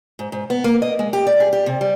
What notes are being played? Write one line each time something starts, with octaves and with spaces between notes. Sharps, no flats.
G#2
G#2
B3
A#3
D#5
G#3
G4
D5
G#4
G4
C3
G3